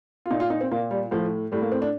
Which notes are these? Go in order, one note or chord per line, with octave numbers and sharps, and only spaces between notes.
F4
A#2 D#4
F4
D#4
C4
A#2 A#3
G3
A2 F3
A2 G3
A#3
C4
D4